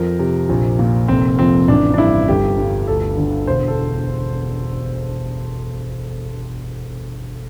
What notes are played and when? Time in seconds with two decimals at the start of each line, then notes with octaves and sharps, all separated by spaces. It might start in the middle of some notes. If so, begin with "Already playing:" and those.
Already playing: F2 A#4
0.19 C3
0.49 A#1
0.79 A#2
1.08 F1 C4
1.39 F2 C4
1.68 A1 D4
1.94 D4
1.98 G2 E4
2.28 G1 G4
2.58 G2
2.87 D2 A4
3.17 D3
3.47 E1 C5
3.68 A4